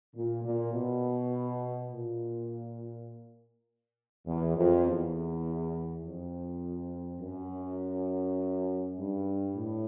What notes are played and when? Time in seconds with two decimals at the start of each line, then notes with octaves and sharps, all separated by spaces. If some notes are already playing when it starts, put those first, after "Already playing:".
0.15 A#2
0.44 A#2
0.73 B2
1.91 A#2
4.26 E2
4.56 F2
4.86 E2
6.03 F2
7.20 F#2
8.98 G2
9.56 A2